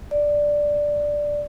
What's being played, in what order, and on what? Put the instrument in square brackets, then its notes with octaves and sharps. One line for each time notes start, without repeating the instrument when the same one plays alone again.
[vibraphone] D5